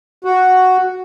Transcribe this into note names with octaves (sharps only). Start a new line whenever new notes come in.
F#4